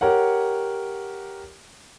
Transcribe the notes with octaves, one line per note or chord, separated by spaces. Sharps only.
G4 A#4 C#5 F#5